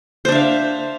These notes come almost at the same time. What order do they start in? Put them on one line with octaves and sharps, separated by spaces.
C5 D4 E5 F5